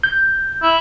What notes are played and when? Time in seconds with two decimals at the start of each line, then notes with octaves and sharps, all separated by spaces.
0.03 G6
0.62 E4